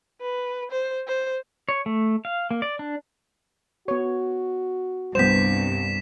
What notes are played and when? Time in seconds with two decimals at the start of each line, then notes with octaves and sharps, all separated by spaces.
0.21 B4
0.71 C5
1.07 C5
1.69 C#5
1.86 A3
2.25 F5
2.51 A#3
2.62 D5
2.79 D4
3.88 B3 F#4 C#5
5.15 C2 G2 B3 C5 B6 E7